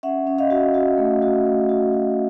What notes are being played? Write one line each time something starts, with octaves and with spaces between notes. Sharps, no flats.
C#4 E5 F#5
C#4
D#5 F5
F#4
F#4
A3
F#4
A3
F#4
F#4